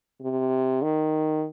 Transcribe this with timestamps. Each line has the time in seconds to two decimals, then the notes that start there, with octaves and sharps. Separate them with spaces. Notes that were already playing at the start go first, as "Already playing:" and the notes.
0.21 C3
0.82 D#3